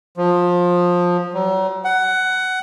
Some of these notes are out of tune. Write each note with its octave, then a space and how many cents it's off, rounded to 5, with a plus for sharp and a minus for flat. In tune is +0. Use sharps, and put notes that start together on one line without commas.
F3 +20
F#3 +45
F#5 +15